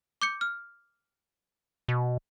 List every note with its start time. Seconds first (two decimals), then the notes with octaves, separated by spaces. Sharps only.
0.21 D6 G6 C#7
0.41 F6
1.88 B2